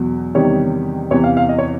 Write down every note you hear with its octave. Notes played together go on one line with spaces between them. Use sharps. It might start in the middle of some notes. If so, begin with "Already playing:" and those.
Already playing: E2 B2 F#3
E2 C3 D#3 G3 C#5
E2 C3 E3 C#5
F5
F5
D#5
C#5